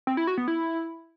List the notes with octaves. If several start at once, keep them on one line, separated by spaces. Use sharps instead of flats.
C4
E4
F#4
B3
E4